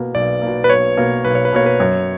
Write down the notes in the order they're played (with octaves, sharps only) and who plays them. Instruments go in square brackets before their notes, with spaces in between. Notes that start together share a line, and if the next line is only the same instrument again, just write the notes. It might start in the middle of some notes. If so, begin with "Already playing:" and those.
Already playing: [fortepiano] B2 A#3
[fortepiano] B1 [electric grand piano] D5
[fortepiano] B2 A#3
[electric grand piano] B4
[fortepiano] B1 [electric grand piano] C#5
[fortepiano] B2 A#3
[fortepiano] B1 [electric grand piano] B4
[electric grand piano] C#5
B4
[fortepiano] B2 A#3 [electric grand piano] C#5
[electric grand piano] B4
[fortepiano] F#2 [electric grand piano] C#5